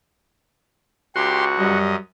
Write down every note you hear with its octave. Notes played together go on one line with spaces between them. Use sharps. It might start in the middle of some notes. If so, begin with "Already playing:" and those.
C#2 F#4 G4 C6
F#2 G3 D#5